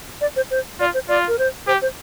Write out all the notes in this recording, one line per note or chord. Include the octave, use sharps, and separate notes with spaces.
D5
C5
C5
F4 D5
C5
F4 D5
A#4
C5
G4 C5
C5